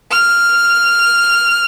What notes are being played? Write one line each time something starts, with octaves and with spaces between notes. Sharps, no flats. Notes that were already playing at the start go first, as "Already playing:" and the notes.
F6